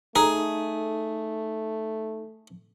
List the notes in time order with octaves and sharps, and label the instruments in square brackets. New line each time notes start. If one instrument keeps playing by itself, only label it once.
[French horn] A3 [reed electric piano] D#4 A4 [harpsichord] G#4 [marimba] A#5